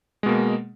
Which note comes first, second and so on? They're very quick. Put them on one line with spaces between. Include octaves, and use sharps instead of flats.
G#3 B2 A#3